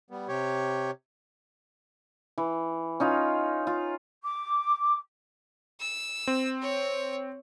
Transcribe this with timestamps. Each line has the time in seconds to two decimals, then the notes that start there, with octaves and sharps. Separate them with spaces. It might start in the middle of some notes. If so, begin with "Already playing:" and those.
0.10 G3 B3
0.28 C3 G4 C#5
2.38 E3
3.00 C#4 D#4 F4
3.67 F4
4.22 D6
5.81 E6
6.27 C4
6.62 C#5